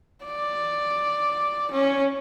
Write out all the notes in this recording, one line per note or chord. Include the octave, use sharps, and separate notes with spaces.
D5
C#4